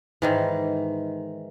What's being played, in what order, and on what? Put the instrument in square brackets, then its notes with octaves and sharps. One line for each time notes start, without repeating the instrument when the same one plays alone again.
[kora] G#2 D#3 E3